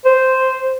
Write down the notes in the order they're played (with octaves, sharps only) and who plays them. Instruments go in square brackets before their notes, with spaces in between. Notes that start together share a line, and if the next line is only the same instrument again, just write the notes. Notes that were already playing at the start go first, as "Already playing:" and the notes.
[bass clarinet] C5